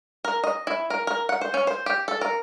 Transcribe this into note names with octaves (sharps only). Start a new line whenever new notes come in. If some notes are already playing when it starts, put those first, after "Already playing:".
A#4
D#5
E4
A#4
A#4
F#5
C5
C#4
C5
G4
A4
A#4